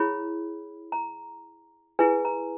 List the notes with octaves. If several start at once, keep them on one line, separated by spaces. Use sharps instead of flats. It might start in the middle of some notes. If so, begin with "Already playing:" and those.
Already playing: E4 G#4 C#5 B5
A#5
E4 G#4 B4 G#5
A#5